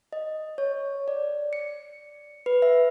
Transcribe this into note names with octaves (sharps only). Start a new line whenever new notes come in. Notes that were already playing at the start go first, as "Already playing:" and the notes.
D#5
C#5
D5
C#7
B4
E5